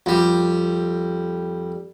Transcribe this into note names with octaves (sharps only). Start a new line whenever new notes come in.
F2 G3